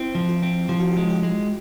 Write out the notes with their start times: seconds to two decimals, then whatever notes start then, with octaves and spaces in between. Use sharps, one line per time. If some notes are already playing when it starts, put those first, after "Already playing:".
Already playing: C4 E4
0.15 F3
0.29 F4
0.43 C4
0.69 F3 G4
0.80 F#4
0.91 G4
0.97 G#3
1.10 G4
1.23 G#3